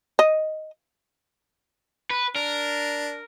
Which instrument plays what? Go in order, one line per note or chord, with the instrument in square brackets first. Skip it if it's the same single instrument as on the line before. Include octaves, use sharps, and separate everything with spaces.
[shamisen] D#5
[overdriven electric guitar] B4
[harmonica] D4 [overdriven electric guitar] A#4